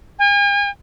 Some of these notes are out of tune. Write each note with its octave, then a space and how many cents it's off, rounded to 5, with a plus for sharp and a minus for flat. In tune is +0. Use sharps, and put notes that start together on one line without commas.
G#5 -40